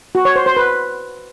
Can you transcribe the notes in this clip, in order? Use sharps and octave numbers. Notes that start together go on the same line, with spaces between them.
F#4
C#5
C5
C5
B4